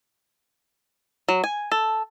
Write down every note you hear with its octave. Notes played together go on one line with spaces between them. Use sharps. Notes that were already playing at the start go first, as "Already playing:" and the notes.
F#3
G#5
A4